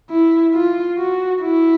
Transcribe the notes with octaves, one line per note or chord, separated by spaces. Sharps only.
E4
F4
F#4
E4